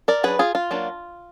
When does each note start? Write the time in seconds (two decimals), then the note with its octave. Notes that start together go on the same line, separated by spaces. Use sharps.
0.08 A#4 D5
0.23 F#3 D4 G#4 B4
0.39 F4 G#4
0.55 F4
0.71 F#3 A#3 D4